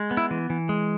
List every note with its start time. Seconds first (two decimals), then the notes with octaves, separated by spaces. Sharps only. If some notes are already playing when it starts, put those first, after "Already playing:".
Already playing: G#3
0.11 B3
0.17 E4
0.31 E3
0.50 E3
0.69 G#3